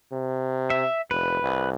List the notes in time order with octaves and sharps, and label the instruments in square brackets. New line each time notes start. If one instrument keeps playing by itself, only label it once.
[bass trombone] C3
[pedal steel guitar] E5
[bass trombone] F1 [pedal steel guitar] B4
[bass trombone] C2